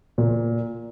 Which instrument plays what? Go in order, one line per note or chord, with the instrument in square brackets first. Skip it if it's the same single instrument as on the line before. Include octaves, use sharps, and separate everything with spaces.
[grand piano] A#2